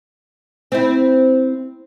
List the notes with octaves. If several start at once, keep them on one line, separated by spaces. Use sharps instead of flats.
C4 E4